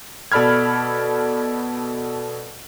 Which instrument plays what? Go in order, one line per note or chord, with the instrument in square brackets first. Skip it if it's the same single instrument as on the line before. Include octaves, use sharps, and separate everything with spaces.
[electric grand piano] B2 A4 D5 B5 F6 G#6